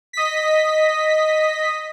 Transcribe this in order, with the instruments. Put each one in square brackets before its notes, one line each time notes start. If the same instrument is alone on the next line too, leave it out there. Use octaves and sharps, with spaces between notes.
[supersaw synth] D#5 B6